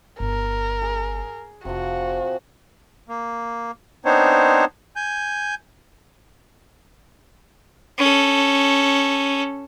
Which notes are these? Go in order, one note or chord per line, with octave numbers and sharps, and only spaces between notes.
G1 A#4
G#4
F1 C3 F3 F#4
A#3
B3 C4 D4 D#4 C5 C#5
G#5 G6
C#4 A4